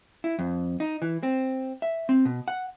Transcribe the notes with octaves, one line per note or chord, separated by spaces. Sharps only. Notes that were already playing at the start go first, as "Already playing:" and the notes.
E4
F2
D#4
E3
C4
E5
C4
B2
F#5